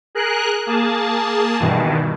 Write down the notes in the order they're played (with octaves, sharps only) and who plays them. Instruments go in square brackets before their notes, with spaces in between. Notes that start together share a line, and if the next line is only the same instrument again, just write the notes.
[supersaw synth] G#4 A#4 F#6
A#3 G#4 A5
G2 B2 D#3 E3